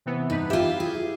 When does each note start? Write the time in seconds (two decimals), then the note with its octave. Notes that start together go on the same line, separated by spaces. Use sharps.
0.06 C3 E3 B3
0.30 G2 D#4 B4
0.50 E4 F4 G4 E5
0.80 G#4